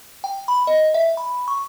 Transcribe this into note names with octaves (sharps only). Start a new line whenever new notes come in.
G5
B5
D#5
E5
B5
C#6